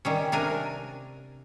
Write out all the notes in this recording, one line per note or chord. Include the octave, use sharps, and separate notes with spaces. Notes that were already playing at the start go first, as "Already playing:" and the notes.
D#3 G3 C#4
C3 D4 A#4 G#5